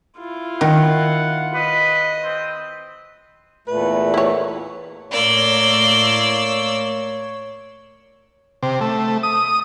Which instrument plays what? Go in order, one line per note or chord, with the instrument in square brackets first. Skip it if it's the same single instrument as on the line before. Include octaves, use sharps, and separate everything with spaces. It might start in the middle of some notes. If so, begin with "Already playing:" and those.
[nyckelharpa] E4 F4
[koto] D#3 [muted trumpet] F#5
[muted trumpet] B4 [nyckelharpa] D#5
[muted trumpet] C4
[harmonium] E2 A#2 A3 [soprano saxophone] B4
[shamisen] E4 C#5
[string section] A2 [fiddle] A#3 E6 [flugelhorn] C#5 [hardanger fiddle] D5 C6
[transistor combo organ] C3
A3
D#6